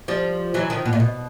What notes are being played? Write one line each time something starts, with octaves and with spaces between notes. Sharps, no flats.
F3 G3
E3 F#3
D#3 F3
B2
A#2
B2